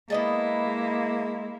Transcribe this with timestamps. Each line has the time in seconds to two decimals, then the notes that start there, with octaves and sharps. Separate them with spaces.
0.10 G#3 A#3 B3 E4 D#5 A5
0.66 G#3